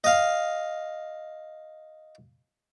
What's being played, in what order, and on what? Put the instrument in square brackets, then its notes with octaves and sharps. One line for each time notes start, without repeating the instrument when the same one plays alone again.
[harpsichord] D#5 F5